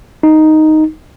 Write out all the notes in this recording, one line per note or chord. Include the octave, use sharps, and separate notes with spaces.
D#4